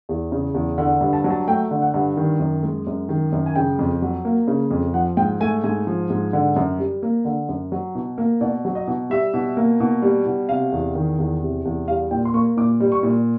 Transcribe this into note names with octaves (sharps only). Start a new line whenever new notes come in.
E2
C#3
E2
D3 F#5
G2
A5
F#3
A5
A3 G5
D3
F#5
G2
D#3
F#2
G#3
F#2
D#3
F#2
G#5
C#3 G5
F2
F#3
A#3
C#3
F2
F3 F#5
G#2 G5
A3 G#5
G#2 G#5
F3
G#2
D3
F#2
G3
A#3
D3
F#2
F#3
B2
A#3
B2 D5
F#3
D#5
B2
G3 E5
B2
A#3
B2
G3
B2
C3 F5
E2
D#3
E2
C3
E2
G3 F5
A#2 G5
C6
A#3 C#6
A#2 D6
G3
C#6
A#2